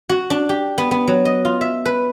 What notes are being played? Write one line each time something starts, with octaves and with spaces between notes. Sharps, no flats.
F#4
D4
G4
B3
B3
F#3
D#5
F4
E5
B4